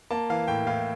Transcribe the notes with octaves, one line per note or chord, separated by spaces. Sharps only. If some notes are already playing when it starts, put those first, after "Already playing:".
A#3 A5
E3 F5
A2 G5
A2 F5